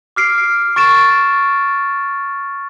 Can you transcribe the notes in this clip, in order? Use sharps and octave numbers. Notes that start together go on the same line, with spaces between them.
D6 F6 C7 D7
C#6 A6 D7 E7